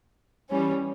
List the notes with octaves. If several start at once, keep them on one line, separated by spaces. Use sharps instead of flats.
E3 G3 C#4